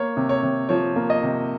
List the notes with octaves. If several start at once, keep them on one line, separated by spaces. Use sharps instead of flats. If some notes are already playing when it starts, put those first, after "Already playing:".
Already playing: A#3 C#5
C3
C#5
C3
F3 C#5
A#3
D#5
C3